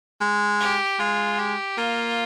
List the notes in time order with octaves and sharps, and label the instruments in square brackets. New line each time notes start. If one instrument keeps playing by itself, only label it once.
[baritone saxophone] G#3
[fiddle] G4
[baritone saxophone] G#3 [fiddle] F4
[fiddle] G4
[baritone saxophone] A#3 [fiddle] F4